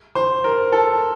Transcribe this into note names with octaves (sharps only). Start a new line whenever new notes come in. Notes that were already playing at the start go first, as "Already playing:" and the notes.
C5
A#4
A4